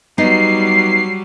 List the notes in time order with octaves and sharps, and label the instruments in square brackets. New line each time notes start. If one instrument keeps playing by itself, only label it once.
[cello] F#3 G3 [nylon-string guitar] B3 D#4 [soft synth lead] C7